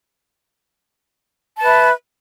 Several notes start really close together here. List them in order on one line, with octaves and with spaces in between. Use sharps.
A5 B4 E5